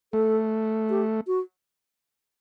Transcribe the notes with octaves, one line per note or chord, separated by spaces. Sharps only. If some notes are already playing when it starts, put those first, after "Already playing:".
A3 A4
G4
F#4